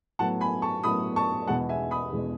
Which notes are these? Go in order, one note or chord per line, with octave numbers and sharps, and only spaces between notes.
A2 F#3 B3 F#5 A5
G#5 B5
A5 C#6
A2 F#3 B3 B5 D#6
A5 C#6
E2 B2 G#3 B3 F#5 A5
E5 G#5
B5 D#6
E2 B2 G#3 B3